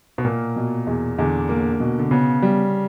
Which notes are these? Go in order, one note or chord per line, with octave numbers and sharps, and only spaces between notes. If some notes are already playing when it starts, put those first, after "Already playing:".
B2
A#2 A#3
B2
E2
E2 D3
A#3
B2
D3
C#3 B3
G3